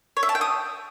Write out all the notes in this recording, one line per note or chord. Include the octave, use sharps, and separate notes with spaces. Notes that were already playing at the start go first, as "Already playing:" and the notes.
C#5
E5
A5
G5
D#6